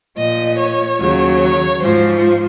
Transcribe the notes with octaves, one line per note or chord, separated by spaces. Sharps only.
A#2 F3 D#5
C#5
D#2 C#3 F#3
C#5
G#2 F3 C5